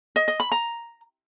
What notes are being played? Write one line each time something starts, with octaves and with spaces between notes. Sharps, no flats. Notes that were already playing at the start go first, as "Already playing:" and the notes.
D#5
D#5
B5
A#5